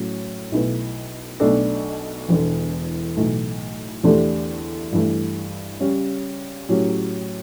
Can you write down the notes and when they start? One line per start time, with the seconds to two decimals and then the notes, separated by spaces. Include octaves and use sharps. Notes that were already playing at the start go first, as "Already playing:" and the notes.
Already playing: A2 F#3 C#4
0.52 B1 B2 A3 E4 B4
1.40 B1 B2 A3 D4 A4
2.29 E1 E2 D3
3.16 B1 A2 E3 A3
4.04 E2 D3 A3 D4 G4
4.92 G2 E3 A3
5.80 C#3 G3 C#4 G4 C#5
6.69 A2 F#3 C#4 G4